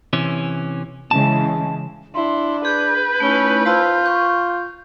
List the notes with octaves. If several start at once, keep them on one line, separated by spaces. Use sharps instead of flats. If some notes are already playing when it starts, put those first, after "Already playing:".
C3 E3 C#4
C#3 E3 G#3 A5
D4 E4 C6
G#4 B4 G6
A3 C#4 D#4 E4
F4 C5 A5 E6
C#6